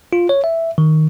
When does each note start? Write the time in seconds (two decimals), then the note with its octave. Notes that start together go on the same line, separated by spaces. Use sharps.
0.13 F4
0.29 C#5
0.44 E5
0.78 D#3